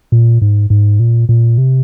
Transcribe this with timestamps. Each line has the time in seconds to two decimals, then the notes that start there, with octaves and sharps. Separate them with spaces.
0.12 A#2
0.42 G#2
0.70 G#2
1.00 A#2
1.29 A#2
1.58 C3